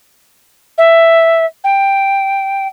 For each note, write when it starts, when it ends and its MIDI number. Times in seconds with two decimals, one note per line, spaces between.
0.78 1.45 76
1.64 2.67 79